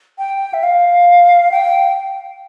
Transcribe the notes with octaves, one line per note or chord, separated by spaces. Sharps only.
G5
E5
F5
G5